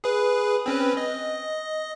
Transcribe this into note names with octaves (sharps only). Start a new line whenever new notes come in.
G#4 B4
C4 C#4 B4
D#5